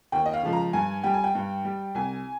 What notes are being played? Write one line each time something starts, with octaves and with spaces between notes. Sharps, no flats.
D#2 G5
D#5
F5
C#3 F3 G#3
A#5
G2 G#5
G3 G5
G#5
G5
G2
G3
C2 G#5